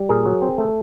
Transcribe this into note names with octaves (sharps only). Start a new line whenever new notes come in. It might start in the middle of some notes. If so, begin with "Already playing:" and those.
Already playing: G3
A#2 G#4 A#4
F#3
C4
A3